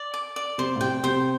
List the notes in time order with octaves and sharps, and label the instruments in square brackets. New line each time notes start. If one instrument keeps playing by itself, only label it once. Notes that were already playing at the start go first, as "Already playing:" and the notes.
Already playing: [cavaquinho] D5
D6
D5
[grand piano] C3 [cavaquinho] C5
[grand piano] A2
[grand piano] C3 [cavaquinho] G5
[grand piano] C3 [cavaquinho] C5